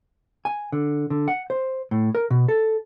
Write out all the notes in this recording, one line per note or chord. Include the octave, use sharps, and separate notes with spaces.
G#5
D3
D3
F#5
C5
A2
A#4
B2
A4